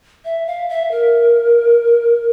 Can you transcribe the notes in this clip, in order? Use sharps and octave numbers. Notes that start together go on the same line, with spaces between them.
E5
F5
E5
A#4